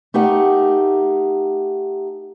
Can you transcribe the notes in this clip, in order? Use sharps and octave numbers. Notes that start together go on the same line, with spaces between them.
A3 D#4 G4 A#4 F#5